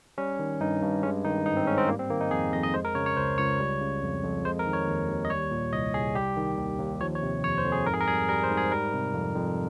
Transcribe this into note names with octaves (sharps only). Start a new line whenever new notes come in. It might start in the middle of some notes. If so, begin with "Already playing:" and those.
G3 C#4
D#3
G2 D#4
G2
G#3 C#4
D#3 D#4
G#2 D#4
C4
G#2 C#4
C4
G3 A#3
C4
D#3 A#3
D#4
F2 G#4
F2 D#5
D#5
G#3 C5
A#4
C#3 C#5
C#5
C#2 C5
C#2 C#5
G3
C#3
F2
F2
G#3 C5
A#4
D#3
C#5
D#2
D#2
D#5
G3 C#5
A#2
C2 D#5
C2 G#4
G3 G4
D#3
D#2
D#2
F3 C#5
C#5
C3
F2 C#5
C5
F2
G#4
G#2 A#4
G#4
A#4
G3 G#4
G3 A#4
C5
G#2
G#4
G3 A#4
C3
F2
F2